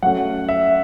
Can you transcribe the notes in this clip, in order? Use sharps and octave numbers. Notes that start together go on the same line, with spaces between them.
F#3 A3 C#4 F#5
E5